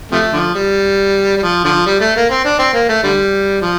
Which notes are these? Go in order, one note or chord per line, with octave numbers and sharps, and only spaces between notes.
C3 F3 A3
D3 F3
G3
G3
F3
D3 F3
G3
A3
A#3
C4
D4
C4
A#3
A3
D3 G3
F3